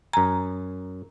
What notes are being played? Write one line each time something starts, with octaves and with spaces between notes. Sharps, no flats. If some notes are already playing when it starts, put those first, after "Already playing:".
F#2 G#5 A#5